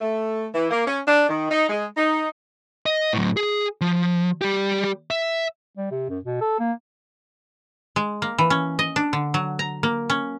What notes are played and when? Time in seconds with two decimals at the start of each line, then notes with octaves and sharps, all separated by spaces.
0.01 A3
0.54 E3
0.71 A#3
0.87 C#4
1.08 D4
1.29 D#3
1.51 D#4
1.70 G#3
1.97 D#4
2.86 D#5
3.13 A2 F#3
3.37 G#4
3.81 F3
4.41 G3 G4
5.10 E5
5.77 G3
5.91 C3
6.09 F#2
6.24 B2
6.41 A4
6.59 A#3
7.96 G#3
8.22 A#3
8.38 E3
8.50 C#4
8.79 D#5
8.96 D4
9.13 D3
9.34 F#3
9.59 A#5
9.83 A#3
10.10 C#4